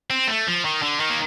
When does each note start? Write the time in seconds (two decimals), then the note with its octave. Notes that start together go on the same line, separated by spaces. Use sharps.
0.10 C4
0.28 A3
0.47 F3
0.65 D#3
0.82 D3
1.00 D#3
1.10 A#3